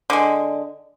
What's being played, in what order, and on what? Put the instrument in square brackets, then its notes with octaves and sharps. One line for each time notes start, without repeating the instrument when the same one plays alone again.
[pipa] D3 G#3